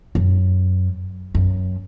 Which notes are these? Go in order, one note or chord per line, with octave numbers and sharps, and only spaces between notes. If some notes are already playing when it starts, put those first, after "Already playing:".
F#2
F#2